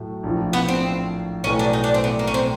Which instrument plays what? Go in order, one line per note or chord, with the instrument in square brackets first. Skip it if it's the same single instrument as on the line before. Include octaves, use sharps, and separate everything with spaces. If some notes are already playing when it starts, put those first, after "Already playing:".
Already playing: [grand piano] A2 F#3 A3
A#1 A2 F3
[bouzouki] B3
C4
[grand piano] B1 A2 E3 A3 [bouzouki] C#4
[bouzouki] D4
D#4
D4
C4
B3
A#3
C#4
C4